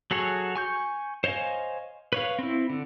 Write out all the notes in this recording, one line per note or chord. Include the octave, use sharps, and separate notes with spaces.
F#3 F#4 G#4 A4 C#5
G#5 C#6 G6
C5 C#5 D#5 F5 G#5
B4 C#5 F5
C4 E4
D3